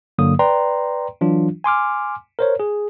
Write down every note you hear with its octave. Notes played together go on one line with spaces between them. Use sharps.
G1 G2 D3 F#3 A#3 D#6
B4 D5 G5 A#5 C6
E3 F#3 D4 F4
G#5 C6 D6 F6
A#4 C5 C#5
G#4